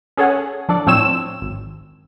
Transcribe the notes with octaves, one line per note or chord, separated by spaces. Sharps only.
C#4 G#4 A4 C#5 F#5 G#5
F3 D4 A4 D5
A2 F3 C4 C#5 E6 E7
G#1